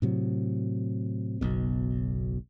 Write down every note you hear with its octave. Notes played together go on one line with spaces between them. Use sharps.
A2 C3 F#3
F#1 B1 B2